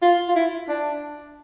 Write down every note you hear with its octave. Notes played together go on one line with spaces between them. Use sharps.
F4
F4
E4
D4